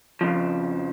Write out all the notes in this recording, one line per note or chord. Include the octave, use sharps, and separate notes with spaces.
F2 C#3 F3